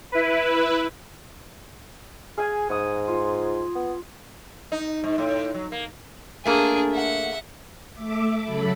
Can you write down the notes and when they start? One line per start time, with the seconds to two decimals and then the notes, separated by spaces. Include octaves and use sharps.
0.12 E4 B4
2.38 G#4 F5 G#5
2.69 G#2 F#5 D#6
3.08 F4
3.75 B3
4.72 D#4
5.04 G#2
5.18 A2
5.54 F#3
5.72 A#3
6.45 A3 A#3 D4 G#4 A#4
6.91 E5 F#5
7.94 A3 E5 D6
8.42 C#3 F#3 A4 B5